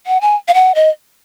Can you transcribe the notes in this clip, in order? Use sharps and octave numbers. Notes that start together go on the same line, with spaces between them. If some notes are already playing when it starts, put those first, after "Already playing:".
F#5
G#5
F5
F#5
D#5